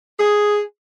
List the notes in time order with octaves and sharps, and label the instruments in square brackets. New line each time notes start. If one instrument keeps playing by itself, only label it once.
[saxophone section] G#4